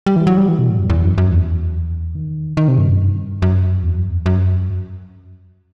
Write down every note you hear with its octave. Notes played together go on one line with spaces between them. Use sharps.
G3
E3
F#3
G3
E3
B2
A2
F#2
E2
F#2
F#2
E2
D#3
D#3
C3
G2
F#2
G2
F#2
E2
F#2
E2
F#2